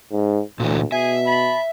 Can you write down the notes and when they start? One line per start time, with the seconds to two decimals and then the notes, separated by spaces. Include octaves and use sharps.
0.12 G#2
0.60 D2 A#2 E3
0.92 B2 G#4 E5 G#5
1.27 A5 B5